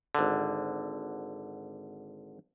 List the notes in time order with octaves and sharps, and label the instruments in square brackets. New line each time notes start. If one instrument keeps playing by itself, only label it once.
[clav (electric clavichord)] G#1 D3